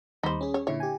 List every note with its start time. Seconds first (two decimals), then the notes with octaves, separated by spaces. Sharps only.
0.23 D#2 G3 D#4 C5 B5
0.41 C#4 G#4
0.54 C#5
0.67 A#2 D3 E4 C#5
0.80 G4 G#5